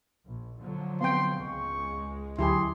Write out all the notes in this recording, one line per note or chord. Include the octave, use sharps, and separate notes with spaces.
A#1
D3 F3 F#3
B3 C4 F5 G5 C6 G6
C#2 G#2 G#3 C#6
D2 D3 F#3 E4 G4 G#4 C6